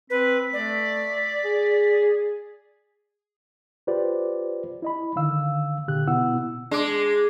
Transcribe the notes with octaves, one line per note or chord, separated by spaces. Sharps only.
C4 B4 B6
A3 D5
G#4
F4 G4 B4 C5 D5
E4 D#5 B5
D3 D#3 F5 E6
A#2 D3 G4 F#6
B2 B3 E4 F#5 E6
G#3 D4 D6